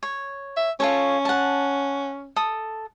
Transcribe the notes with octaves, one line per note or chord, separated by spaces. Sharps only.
C#5
E5
C#4 F4 A4 C#5
F#5 A5
A4 D#6